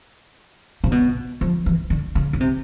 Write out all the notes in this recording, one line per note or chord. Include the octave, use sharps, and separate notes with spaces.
C3
B2
F3
E3
D3
C#3
C#3
C3